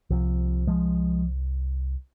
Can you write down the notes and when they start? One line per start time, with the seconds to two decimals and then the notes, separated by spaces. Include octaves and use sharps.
0.10 C2 C3 F3
0.67 F3 G#3